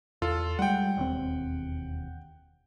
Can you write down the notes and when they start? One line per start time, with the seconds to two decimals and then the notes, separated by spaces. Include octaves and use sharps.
0.22 E2 F4 A4
0.59 G3 G#3 F#5 G5
0.97 E1 D#2 C4